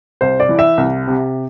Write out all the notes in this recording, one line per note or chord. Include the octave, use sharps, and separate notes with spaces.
C2 C5
D5
E3
E5
C2
C3